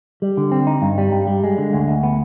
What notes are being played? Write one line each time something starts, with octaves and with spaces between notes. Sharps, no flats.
G3
D3
C4
D#4
G2
G3
G2
G3
G#3
D3
D2
D2
B3